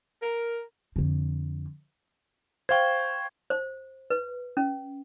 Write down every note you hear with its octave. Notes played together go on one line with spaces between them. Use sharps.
A#4
F2 D3
C5 F5 G5 C#6 G#6
C5
B4
C#4